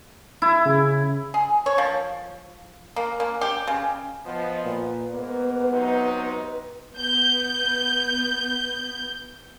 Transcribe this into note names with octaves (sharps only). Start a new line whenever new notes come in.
E4
C#3
G#4
C#5
F3
A#3
A#3
G4
C#3
F3 B3 D#5
A#2 B4
G#2 A#3 B3
C3 F#3 D#4
B3 G6